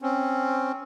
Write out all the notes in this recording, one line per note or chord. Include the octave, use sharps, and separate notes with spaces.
C4 C#4